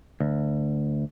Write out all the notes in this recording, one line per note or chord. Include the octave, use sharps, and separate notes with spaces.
D2